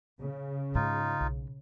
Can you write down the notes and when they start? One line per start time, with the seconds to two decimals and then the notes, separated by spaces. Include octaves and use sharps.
0.21 C#3
0.75 G#2 D#4 F4
1.20 B1